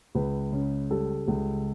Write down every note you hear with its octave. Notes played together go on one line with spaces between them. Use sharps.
C#2 B4
C#3
G3 A4
C#2